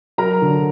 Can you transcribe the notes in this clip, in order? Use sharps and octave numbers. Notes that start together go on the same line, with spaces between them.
F#3 A#4 A#5
D3